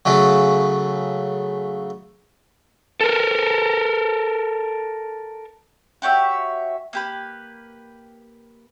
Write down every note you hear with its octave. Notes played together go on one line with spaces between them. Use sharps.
C#3 F#3 A3
A4 A#4
F#4 G4 C#5 E5
A#3 G4 B4